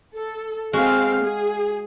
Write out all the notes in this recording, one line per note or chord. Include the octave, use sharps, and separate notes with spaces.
A4
G#3 C4 F#4 F5
G#4